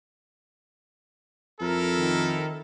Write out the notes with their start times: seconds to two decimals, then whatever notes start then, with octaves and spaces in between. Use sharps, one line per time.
1.61 F2 E4 A4 A#4
1.97 D#3